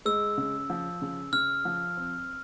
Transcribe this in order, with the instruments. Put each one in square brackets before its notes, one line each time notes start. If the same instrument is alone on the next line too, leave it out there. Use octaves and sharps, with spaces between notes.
[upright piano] G#3 [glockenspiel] E6
[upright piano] C#3
F3
C#3
[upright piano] C#3 [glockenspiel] F6
[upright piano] F3
C4